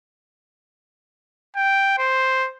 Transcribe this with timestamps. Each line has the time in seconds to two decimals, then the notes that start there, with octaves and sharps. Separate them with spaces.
1.57 G5
1.98 C5